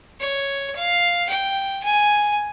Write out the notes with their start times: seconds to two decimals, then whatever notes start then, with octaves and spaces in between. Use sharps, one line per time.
0.19 C#5
0.75 F5
1.29 G5
1.84 G#5